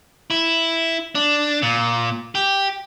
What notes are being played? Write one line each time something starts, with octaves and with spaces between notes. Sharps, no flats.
E4
D4
A#2
G4